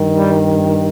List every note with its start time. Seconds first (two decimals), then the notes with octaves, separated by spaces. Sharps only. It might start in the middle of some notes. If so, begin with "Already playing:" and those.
Already playing: G2 D#3
0.18 G3